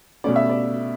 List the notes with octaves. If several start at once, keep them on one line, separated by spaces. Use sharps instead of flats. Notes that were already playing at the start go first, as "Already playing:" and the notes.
B2 A3 C#4 D5
E5
D5